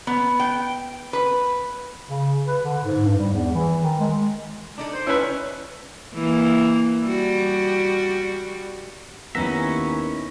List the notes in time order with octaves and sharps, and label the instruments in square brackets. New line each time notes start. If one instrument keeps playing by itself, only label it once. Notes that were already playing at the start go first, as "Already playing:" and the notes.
[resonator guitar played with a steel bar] B3
G5
B4
[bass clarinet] C#3
B4
D3
G#2
G2
G3
E2
E3
D#3
G#3
[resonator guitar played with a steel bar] D4 D#4 A4
[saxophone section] C5
[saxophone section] D2 E4 C#5 [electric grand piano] C#4 B4
[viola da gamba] E3 A#3
G3 F#4
[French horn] D#2 [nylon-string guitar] B3 D#4 E4 [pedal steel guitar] C#4 E5 [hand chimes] A#5 A#6